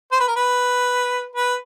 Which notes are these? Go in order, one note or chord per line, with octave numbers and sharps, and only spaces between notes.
C5
B4
A#4
B4
B4